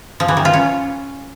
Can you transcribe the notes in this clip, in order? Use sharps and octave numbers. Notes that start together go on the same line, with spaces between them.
F3
E3
D#3
F4
C#4